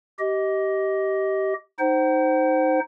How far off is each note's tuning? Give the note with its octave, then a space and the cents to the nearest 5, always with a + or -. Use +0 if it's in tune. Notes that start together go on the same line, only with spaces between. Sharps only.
G4 -20 D#5 +15
D#4 +0 C5 +0 F#5 +45